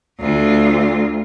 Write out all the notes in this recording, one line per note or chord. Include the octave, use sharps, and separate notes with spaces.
D2 F4